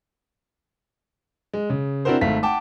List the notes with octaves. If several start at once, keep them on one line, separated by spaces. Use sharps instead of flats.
G#3
C#3
C4 D4 E4 F#4 A#4 C5
G#1 A3 F5 B6
F#5 G5 A5 D6